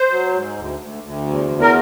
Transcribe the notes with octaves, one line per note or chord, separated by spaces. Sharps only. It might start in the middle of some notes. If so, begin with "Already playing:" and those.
Already playing: C5
F#3
G#2
D2
D2
D2
E2
E2
A#4